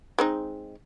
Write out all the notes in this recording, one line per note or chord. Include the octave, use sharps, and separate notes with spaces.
G#3 C4 D#4